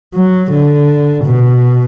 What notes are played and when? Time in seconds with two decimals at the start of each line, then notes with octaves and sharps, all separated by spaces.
0.15 F#3
0.52 D3
1.25 B2